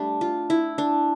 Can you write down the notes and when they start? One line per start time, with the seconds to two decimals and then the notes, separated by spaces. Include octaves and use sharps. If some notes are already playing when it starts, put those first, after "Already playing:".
Already playing: G3 A3 D4
0.21 F4
0.50 E4
0.78 D4